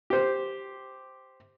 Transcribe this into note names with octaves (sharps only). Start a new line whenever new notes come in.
G4 C5